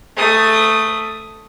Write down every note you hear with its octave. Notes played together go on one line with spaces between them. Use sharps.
A3 D#6